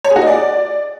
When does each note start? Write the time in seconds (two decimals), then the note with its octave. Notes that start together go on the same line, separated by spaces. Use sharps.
0.04 C#5
0.10 G#4
0.16 F#4
0.22 D#5
0.27 D5